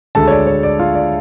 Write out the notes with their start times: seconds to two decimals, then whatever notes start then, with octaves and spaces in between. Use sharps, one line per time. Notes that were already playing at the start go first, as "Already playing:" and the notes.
0.15 D2 D3 G#3 A4 A5
0.27 C#5
0.30 D5
0.47 C#5
0.63 D5
0.79 F4 F5
0.95 D5